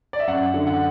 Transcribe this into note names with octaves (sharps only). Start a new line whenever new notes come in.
D5
E5
F#2 F#5
D3
F#5